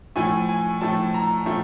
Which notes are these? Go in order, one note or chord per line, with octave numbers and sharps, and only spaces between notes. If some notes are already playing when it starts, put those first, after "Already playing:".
A2 F3 A3 G#5
G#5
A2 F3 A3 A5
A#5
A2 F3 A3